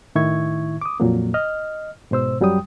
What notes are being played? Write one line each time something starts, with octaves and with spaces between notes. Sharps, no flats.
A2 D#3 E4 E5 C#6 G#6
D6 D#6
F2 A#2 F#3 A#3
D#5 F6
G#2 B2 C5 E6
F#2 F#3 G3 G5 D#6